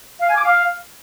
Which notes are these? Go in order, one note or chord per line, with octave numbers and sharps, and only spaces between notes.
F5
G#5
D6
F5